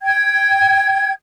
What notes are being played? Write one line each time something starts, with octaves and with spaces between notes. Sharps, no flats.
G5 G#6